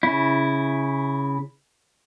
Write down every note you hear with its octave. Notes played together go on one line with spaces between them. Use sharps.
C#3 E4